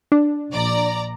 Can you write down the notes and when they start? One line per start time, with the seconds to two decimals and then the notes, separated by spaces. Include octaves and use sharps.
0.12 D4
0.50 A#1 D5 A#5